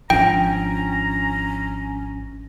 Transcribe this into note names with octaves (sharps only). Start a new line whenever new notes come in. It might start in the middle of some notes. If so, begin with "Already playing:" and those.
G#1 F3 C#4 D4 G5 A#5